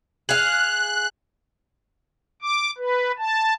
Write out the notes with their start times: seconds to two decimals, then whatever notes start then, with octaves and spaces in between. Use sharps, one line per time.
0.29 G#4 F5 F#6
2.42 D6
2.78 B4
3.18 A5